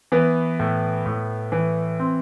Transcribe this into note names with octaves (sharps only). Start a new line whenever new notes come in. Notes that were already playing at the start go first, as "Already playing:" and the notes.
E3 B3
A2
A2
E3
C4